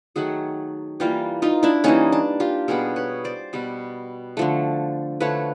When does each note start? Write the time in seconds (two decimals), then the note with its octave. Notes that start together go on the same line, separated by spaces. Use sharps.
0.16 D#3 F#3 A3 F#4 G#4
1.00 E3 G3 A#3 F4 G4
1.42 D#4 F4
1.63 D4 E4
1.84 E3 G3 A#3 C#4 D#4
2.12 D4
2.40 F4 G4
2.68 B2 G3 B3 G#4 A#4
2.96 B4 C#5
3.24 C5 D5
3.53 B2 G3 B3
4.37 D3 F3 A3
5.20 D3 F3 A3 B4 C#5